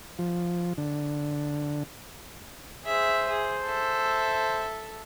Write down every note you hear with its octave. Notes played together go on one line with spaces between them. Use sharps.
F3
D3
G#4 C5 E5
G#4
A4 E5